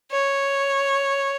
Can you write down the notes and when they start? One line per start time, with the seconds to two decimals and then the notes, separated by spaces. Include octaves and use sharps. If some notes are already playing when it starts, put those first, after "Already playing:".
0.11 C#5